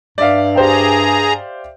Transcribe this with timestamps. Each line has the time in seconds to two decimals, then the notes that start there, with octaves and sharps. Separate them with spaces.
0.18 G2 D5 E5 F5
0.56 G4 G#4 C5 G5 A#5